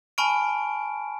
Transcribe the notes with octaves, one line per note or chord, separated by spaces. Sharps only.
G#5 A5 B5 C#6 F6 D7